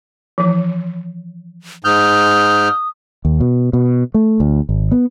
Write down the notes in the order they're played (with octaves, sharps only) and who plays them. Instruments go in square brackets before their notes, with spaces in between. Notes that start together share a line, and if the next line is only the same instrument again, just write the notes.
[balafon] E3 F3
[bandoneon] G#2 F6 G6 [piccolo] D#6
[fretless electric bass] D#2
B2
B2
A3
D2
G#1
B3